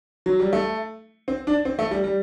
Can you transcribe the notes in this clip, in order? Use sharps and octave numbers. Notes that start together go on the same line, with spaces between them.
F#3
G3
A3
C4
D4
C4
A3
G3
G3